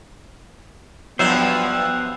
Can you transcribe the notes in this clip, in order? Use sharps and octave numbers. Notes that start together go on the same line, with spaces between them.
G2 F3 F#3 B3 C5 E5 F#5